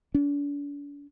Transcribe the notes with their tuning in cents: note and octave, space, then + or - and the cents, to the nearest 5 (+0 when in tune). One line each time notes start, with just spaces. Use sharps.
D4 -40